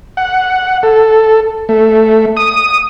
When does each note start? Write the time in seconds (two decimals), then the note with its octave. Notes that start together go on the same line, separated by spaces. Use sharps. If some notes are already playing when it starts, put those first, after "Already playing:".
0.17 F#5
0.83 A4
1.69 A3
2.37 D#6